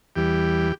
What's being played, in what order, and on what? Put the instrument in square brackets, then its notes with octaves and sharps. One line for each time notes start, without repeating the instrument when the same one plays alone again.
[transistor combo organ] E2 E3 G3 G4